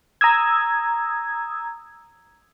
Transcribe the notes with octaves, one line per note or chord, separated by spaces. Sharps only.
A#5 D#6 E6 G#6